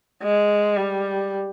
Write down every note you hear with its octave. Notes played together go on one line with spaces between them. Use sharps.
G#3
G3